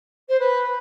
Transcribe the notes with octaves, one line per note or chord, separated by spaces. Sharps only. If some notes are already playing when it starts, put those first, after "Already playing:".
C5
B4